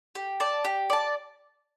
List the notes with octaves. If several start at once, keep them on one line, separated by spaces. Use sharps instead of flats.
G4
D5 A5
G4
D5 A5